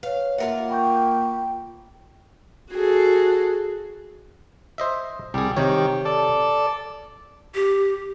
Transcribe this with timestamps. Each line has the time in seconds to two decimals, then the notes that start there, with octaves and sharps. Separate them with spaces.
0.03 B4 C#5 F5
0.38 A#3 F4 A#4 E5 F#5
0.70 G5 B5 C#6 G6
2.71 F#4 G#4 A4
4.78 C5 D#5 E5
5.34 C2 G3 G#4
5.57 C3 D#3 G4 C#5
6.05 A4 D5
7.55 G4